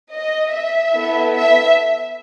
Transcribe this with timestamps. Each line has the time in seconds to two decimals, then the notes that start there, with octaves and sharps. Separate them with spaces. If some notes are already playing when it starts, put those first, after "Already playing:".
0.13 D#5
0.53 E5
0.93 B3 E4 A4
1.32 E5